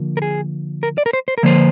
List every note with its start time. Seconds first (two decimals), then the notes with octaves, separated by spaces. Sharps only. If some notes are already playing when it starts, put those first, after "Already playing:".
Already playing: D3 F3 A#3
0.17 A#4
0.22 G#4
0.83 A#4
0.98 D5
1.06 A#4
1.13 C5
1.28 C5
1.38 A#4
1.43 D3 F3 A#3 C5